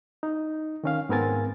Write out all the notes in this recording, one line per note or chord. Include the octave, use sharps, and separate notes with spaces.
D#4
D#3 C#4 F5
G#2 B3 C4 A#4 G#5 A6